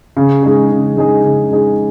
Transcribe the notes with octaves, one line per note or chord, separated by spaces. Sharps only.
C#3
G#3 D#4 G#4
C#3
G#3 D#4 G#4
C#3
G#3 D#4 G#4